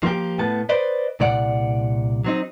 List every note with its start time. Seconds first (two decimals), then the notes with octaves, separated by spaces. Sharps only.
0.03 F3 A#3 G4
0.39 A2 B3 A5
0.69 B4 C5 D5 D#5
1.20 C2 A#2 D5 F#5
2.24 F#3 C4 D#4